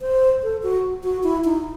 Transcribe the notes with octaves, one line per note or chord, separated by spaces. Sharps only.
C5
A4
F#4
F#4
E4
D#4